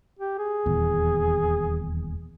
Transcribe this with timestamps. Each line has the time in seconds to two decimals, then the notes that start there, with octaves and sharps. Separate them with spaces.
0.19 G4
0.38 G#4
0.66 D#1 E2